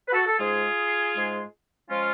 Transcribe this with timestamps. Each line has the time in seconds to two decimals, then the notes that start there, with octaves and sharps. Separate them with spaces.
0.08 B4
0.12 F#4 A4
0.27 A4
0.38 G#2 G#3 F4 G#4
1.14 G#2 G#3
1.89 F3 G#3 C#4 F4